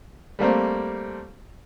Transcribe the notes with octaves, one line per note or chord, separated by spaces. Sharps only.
G3 A3 A#3 C4